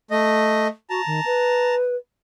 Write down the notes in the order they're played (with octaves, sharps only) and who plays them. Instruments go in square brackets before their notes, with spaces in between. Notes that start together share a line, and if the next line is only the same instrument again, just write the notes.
[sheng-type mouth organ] A3 D#5
[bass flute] F#4 [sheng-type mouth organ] A5 A#5
[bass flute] D#3
B4